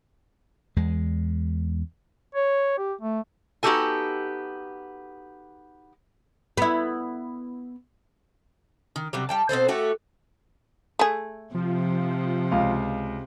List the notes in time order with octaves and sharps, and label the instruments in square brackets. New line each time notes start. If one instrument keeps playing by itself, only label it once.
[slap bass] E2 G#3
[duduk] C#5
G4
A3
[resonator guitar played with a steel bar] B3 D#4 F#4 G4 A4 G#5
[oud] B3 E4
[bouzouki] D#3
C3 F#3 G3
G3 G5 A5
B2 C4 A4 C5
A3 F#4 G4
[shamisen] A3 G#4
[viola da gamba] C3 [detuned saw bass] F3
[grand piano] C#2 F5